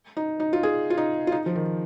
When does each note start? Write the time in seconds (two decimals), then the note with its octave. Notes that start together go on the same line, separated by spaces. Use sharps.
0.17 D#4
0.40 D#4
0.53 F4
0.63 G#4
0.90 F4
0.98 D#4
1.27 F4
1.32 D#4
1.46 F3
1.56 D#3